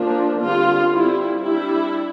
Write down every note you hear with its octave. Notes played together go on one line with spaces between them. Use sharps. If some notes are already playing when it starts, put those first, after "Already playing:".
Already playing: F3 A#3 D4
D3 G3 C4 F4
G3 C4 E4
G3 D4 E4